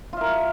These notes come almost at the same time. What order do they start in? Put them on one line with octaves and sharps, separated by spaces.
F4 E5 A#4